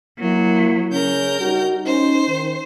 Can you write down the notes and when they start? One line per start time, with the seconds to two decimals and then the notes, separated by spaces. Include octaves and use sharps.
0.20 F#3 A#3 E4
0.91 C#3 C#4 A#4 G6
1.41 G3 D#4 F#4
1.85 C#4 D#4 C5
2.28 D#3